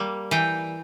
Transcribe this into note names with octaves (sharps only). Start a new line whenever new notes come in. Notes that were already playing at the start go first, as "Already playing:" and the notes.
Already playing: G3 A#3
E3 G5